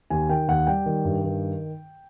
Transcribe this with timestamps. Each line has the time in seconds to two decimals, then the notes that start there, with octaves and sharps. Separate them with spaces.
0.10 D#2 G#5
0.30 D#3 G5
0.48 D#2 F#5
0.67 G3 G5
0.86 D#3
1.05 G2
1.24 D#3